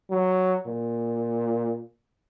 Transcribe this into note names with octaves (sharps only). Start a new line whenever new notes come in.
F#3
A#2